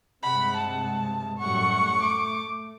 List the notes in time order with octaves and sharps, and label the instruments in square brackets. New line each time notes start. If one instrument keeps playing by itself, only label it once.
[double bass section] G2 C3 G#3 [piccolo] F#5 [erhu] B5
[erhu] A5
[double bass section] F#2 A2 G3 [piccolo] F#5 [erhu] C#6
[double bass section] A3 [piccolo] D6